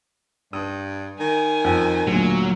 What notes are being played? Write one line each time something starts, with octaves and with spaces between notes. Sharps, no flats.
G2 D#6
D#3 G#5
F2
D2 A#2 F#3